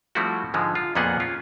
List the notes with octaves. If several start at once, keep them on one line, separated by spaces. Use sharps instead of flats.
F3 G3 A3 C4 E4 F#4
G#2 D3 F3 G#3
F4
F2 A#2 A#3 B3 G#4 F#5
C#4 F4